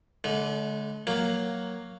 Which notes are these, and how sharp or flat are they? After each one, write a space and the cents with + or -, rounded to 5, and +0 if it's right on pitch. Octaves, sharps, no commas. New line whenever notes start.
D3 -20 G#3 +40
F#3 +0 A#3 +0